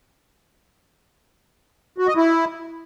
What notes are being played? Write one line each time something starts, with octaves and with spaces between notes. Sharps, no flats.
F#4
D#5
E4